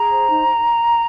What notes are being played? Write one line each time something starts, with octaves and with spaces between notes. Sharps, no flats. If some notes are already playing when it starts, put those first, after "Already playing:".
Already playing: G#4 A#5
C5
D#4